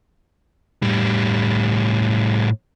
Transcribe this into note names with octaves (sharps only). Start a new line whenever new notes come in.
A2 G3